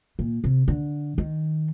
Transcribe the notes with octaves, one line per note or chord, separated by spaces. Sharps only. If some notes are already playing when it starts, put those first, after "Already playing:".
A#2
C3
D3
D#3